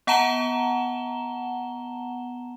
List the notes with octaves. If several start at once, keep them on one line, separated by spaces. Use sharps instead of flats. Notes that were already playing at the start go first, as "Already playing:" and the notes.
B3 F#5 A5 A#5 E7 G7